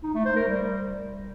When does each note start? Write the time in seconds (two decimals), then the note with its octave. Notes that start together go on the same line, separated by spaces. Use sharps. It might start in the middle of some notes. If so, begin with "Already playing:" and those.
0.03 D#4
0.14 A3
0.25 C5
0.36 A#4
0.47 G3